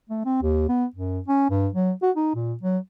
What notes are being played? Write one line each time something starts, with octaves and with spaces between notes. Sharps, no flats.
A3
C4
D#2
B3
F#2
C#4
G2
F#3
F#4
D#4
A#2
F#3